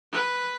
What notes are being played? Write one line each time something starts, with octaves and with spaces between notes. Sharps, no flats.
B4